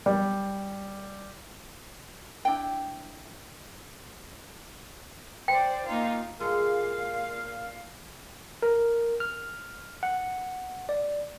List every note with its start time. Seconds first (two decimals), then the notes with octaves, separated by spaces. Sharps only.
0.06 G3
2.45 D4 E4 G5
5.48 C5 D5 G5
5.86 A#3 D#4 F4
6.40 A#2 G#3 A4 F5 A#5
8.62 A#4
9.20 F6
10.03 F#5
10.89 D5